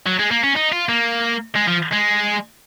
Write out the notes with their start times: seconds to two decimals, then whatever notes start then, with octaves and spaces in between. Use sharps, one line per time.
0.06 F#3
0.19 G#3
0.31 A#3
0.44 C#4
0.57 D#4
0.73 F4
0.89 A#3
1.56 G#3
1.68 F3
1.93 G#3